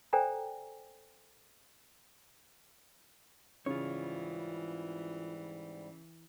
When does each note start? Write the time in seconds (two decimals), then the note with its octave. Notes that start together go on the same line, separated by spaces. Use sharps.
0.13 A4 C5 D5 G5 G#5 A#5
3.66 G#2 C#3 E3 G3 F4 C#5